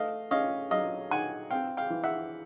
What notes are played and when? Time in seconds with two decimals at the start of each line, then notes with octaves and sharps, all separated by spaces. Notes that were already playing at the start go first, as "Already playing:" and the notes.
Already playing: A3 D#5 F5
0.31 C#4 D#5 F5
0.71 F#3 D#5 F5
1.11 D#3 F#5 G#5
1.51 C4 F5 G5
1.77 F5 G5
1.90 E3
2.04 E5 F#5